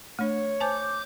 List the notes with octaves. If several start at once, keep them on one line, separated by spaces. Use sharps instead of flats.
A3 D4 C#5
C5 G#5 A5 D6 G6